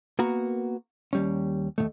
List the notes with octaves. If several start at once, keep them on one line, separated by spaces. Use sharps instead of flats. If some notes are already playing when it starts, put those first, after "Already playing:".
A#3 B3 F#4 A#4
D#2 G3 C#4
D#2 B2 A3